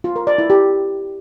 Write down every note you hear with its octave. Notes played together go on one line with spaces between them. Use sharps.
F4
A#4
D5
E4
G4